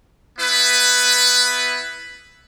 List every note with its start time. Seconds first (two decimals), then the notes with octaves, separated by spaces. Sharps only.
0.39 B3 E4 B4